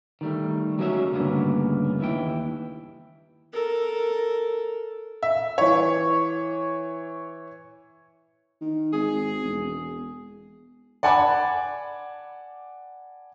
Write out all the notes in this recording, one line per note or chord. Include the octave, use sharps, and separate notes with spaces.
D#3 G3 A3
F#3 G#3 A#3 C#4 F#4 E5
D2 G2 C#3 A#3 B3
D#2 E3 E4 G5
A4 A#4
E5
E3 C#5
D#3
G#1 G#4
E1
D5 F#5 G#5 A5 B5 D6